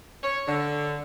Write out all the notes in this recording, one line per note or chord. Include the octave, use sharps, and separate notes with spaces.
C#5
D3